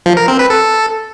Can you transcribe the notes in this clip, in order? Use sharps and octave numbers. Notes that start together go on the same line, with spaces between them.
F3
A#4
C4
B4
A4